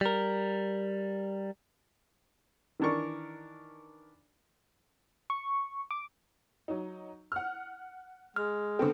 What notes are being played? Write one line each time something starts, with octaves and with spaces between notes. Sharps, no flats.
G3 A#4
D#3 E3 D4 A#4 C#6
C#6
D6
F#3 D#4
F#5 F6
G#3 F6
D3 B3 C4 A4